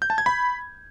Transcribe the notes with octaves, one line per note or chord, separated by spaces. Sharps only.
G6
A5
G#6
B5